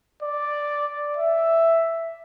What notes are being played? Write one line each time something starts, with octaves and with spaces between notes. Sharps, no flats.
D5
E5